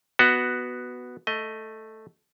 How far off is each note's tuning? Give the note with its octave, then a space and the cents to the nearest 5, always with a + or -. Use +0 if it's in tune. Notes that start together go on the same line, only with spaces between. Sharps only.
B3 +0 F#4 +0 D#5 +0
A3 +0 D#5 +10